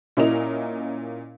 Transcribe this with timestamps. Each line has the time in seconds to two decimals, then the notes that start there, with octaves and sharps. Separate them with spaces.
0.17 A#2 C#4 E4 A#4 D#5 F7